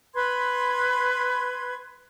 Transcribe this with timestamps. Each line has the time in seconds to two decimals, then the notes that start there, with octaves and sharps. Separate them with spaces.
0.15 B4 B5 C6 G#6